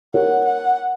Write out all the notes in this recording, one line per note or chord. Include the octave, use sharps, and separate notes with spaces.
G4 A#4 C#5 F#5
F#5